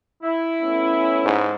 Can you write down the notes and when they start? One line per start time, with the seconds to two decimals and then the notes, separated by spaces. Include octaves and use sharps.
0.23 E4
0.62 A3 B3 C#4
1.25 G#2